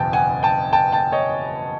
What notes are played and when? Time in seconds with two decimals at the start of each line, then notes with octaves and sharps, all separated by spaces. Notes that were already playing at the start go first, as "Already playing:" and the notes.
Already playing: F#1 E2 B2 G5 A5
0.13 F#5 G#5
0.43 G5 A5
0.73 G5 A5
0.92 G5 A5
1.12 C#5 D#5